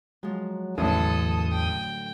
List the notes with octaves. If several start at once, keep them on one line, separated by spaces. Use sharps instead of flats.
F3 F#3 G#3
A1 E2 A2 D3 F#3 A4 A5 D#6
G5